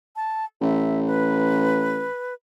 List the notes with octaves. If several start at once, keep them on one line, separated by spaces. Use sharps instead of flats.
A5
A1 E5
B4